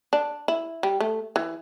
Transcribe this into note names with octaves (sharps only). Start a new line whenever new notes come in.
D4
E4
G3
A3
E3